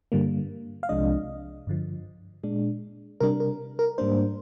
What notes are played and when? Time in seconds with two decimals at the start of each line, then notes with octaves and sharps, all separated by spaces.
0.12 G2 D3 G3 A#3
0.83 F5
0.89 C2 C3 F3 G#3 D4 D#5
1.67 G2 D3 F3
2.43 A#2 G#3 D4
3.20 C3 G3 D4 A#4
3.40 A#4
3.79 A#4
3.98 G#2 G3 A#3 D4 C5